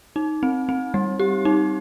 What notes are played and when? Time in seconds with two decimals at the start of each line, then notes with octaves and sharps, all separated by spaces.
0.16 D#4
0.43 C4
0.69 C4
0.94 G3
1.19 G4
1.45 D#4